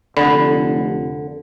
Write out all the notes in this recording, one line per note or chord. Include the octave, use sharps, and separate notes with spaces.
F1 D3 D5 B5